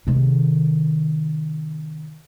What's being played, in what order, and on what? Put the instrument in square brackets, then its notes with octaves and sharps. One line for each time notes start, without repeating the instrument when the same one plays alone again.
[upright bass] C3 D#3